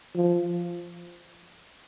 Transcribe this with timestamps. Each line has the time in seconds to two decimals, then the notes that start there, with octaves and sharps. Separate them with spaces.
0.15 F3